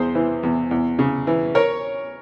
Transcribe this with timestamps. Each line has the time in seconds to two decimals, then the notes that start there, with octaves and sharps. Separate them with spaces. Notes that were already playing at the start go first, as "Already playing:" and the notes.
Already playing: E2 G#4 C5
0.15 E3
0.43 E2
0.71 E2
0.99 C#3
1.27 E3
1.55 A#4 C#5